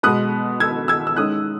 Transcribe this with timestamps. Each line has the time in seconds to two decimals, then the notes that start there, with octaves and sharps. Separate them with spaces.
0.03 B2 G#3 B3 D#6 F#6
0.60 E6 G#6
0.88 E6 G#6
1.07 E6
1.16 D#3 G#3 C#4 D#6 F#6